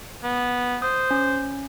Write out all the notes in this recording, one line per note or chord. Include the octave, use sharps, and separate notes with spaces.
B3
C5 D#6
C#4